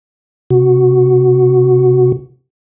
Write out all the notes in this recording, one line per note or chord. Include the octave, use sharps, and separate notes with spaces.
C3 F#4